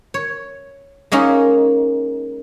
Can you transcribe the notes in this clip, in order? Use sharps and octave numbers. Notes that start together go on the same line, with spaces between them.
C#5
G#3 A#3 C#4 D#4